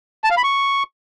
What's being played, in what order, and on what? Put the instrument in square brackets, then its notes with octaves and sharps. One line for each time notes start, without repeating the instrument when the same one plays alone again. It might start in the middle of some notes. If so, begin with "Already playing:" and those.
[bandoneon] A5
F5
B5
C#6